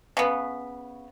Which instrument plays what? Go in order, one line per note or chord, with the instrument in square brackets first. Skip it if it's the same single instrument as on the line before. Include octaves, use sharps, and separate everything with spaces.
[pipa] C#3 B3